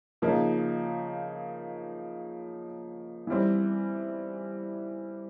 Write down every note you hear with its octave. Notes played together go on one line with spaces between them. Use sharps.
C#3 F3 A#3 D#4
E3 G3 C4